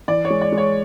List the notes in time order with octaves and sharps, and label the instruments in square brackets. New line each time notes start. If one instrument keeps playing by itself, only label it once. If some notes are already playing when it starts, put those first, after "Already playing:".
[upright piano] E3 D5
C#5
G#3
D5
G#3
C#5